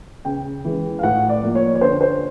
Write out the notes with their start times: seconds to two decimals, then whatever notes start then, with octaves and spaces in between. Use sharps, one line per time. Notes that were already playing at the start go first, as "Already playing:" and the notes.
0.25 C#3 G5
0.65 E3 G#3
0.99 F5
1.03 A2 F#5
1.29 D5
1.42 F3 A#3
1.55 C#5
1.75 C#5
1.81 D3 C5
2.01 C5